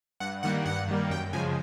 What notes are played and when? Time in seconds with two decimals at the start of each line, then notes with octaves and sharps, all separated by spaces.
0.20 G2 F#5
0.43 D#3 G3 A#3 F#5
0.65 G2 F#5
0.88 D#3 G3 A#3
1.10 F#2 G5
1.33 C#3 F3 G#3 G#5